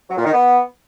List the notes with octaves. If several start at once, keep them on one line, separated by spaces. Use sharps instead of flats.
F#3
A#2
D#3
B3